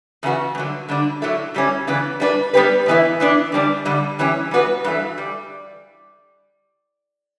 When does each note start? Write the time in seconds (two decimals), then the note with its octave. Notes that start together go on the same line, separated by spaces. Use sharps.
0.23 E2 C#3 B3 F#4
0.55 G2 D3 F#3
0.88 D3 G3 D4
1.22 A2 F#3 A3
1.54 A2 G3 C#4
1.87 C#3 E3 B3 D4
2.20 G3 D4 F#4 B4
2.54 G3 B3 D4 G4 B4
2.86 A2 E3 B3 E4
3.20 E3 B3 D4
3.52 D3 G3 D4
3.85 G2 D3 G3
4.19 G2 E3 C#4 G4
4.51 G3 B3 F#4 B4
4.84 G2 E3 A3
5.18 G3